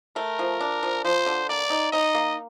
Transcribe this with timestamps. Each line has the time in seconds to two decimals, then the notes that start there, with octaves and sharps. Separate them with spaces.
0.16 A3 A#4
0.39 F3
0.60 D4
0.83 F3
1.05 F3 C5
1.26 D3
1.49 A#3 D5
1.70 D#4
1.92 D#4 D#5
2.15 A#3